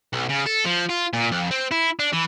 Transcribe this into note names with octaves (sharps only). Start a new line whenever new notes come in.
B1
C#3
A4
F3
F4
A#2
F2
C4
E4
D4
E3